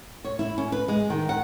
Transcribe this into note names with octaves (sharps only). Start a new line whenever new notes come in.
C#5
E4
C#4
B4
G#3
D#3
F#5